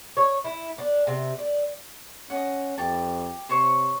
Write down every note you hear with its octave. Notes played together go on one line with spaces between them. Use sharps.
C#5
E4
D4
C3
D5
C#4 D#5 F#5
F2 G4 A5
C3 C5 C#5 C#6